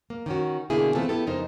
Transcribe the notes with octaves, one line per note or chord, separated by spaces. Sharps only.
A#3
D#3 C#4 F#4
B2 D3 A#3 E4 G#4
E3 A3 B3 C4 F4 A4
B3 E4 G4 A4
F2 C#3 D#4 A#4 C5